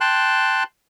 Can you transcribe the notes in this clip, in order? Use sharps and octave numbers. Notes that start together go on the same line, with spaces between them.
G5 A5 C6 F#6